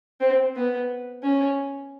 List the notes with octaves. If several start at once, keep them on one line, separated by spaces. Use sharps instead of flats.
C4
B3
C#4